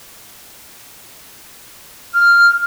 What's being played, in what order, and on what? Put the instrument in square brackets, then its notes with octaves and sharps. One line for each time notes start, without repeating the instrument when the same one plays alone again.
[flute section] F6